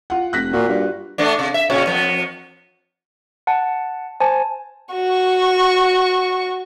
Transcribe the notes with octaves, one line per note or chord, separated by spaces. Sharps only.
F4 F#5
F1 F#6 A#6 B6
A#2 F4 F#4
G2
A3 B3 D4
C3
E5
A#2 C#3 C#4
F2 B3
F#5 A5
C5 G#5 A5
F#4 C#6